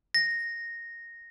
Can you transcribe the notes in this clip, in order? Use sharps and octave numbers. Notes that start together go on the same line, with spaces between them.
A#6